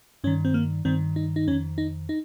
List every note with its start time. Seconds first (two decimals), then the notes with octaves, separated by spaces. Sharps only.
0.24 G2 D#3 C#4
0.45 C4
0.54 A#3
0.85 G2 D#3 C4
1.16 D#4
1.36 D#4
1.47 F2 D#3 C#4
1.78 D#4
2.09 D#4